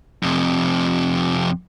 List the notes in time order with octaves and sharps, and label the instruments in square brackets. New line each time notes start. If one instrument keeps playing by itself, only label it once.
[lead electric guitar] F2 C3